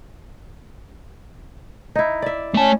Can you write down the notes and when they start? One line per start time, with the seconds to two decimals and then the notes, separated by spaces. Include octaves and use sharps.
1.95 D#4 E4
2.22 D5 E5
2.54 A3 C#4 A5